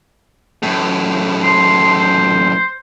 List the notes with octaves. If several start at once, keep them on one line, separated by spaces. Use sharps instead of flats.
F#2 A2
C6
C5